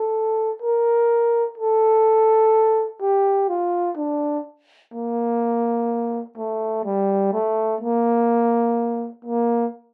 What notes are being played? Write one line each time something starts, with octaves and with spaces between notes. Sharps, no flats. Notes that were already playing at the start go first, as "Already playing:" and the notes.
Already playing: A4
A#4
A4
G4
F4
D4
A#3
A3
G3
A3
A#3
A#3